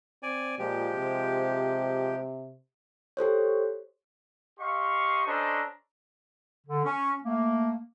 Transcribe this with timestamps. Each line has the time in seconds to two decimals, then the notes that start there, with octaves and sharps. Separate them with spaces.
0.23 C4 D5 G#5
0.59 A#2 F3 G#3 G4
0.95 C3
3.17 G4 A4 C5 C#5
4.59 G4 D#5 F5 C6 C#6
5.27 C#4 D4 A4 C5 D#5 A#5
6.67 D3
6.85 C#4
7.24 A3 A#3